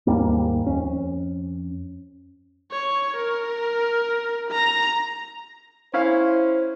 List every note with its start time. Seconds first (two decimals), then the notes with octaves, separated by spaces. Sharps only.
0.07 D#2 G#2 G3 A#3
0.67 F2 C#4
2.72 C#5
3.17 A#4
4.51 A#5
5.94 C#4 E4 C5 F5